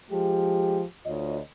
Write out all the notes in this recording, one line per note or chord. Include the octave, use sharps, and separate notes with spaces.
F3 G#3 G4
D2 F4 C#5 D#5